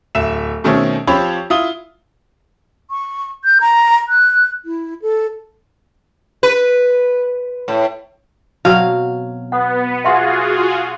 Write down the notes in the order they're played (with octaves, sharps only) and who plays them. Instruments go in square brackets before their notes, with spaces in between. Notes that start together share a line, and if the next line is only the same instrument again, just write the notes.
[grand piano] D1 E5 E7
B2 D#3 A3 C4 C#4
F3 C4 G4 C#5 B5 C#6
E4 F4 D#6 G7
[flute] C#6
G6
A#5
F#6
E4
A4
[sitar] B4
A2
[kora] B2 F#3 C4 [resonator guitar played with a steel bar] F5 [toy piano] A5
[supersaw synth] B3 [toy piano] F#5
[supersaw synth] F4 F#4 G#4 [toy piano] E5 F#5 C6